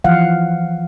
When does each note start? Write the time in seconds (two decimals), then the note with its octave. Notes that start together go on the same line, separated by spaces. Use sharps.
0.04 E3 F3 F5 F#5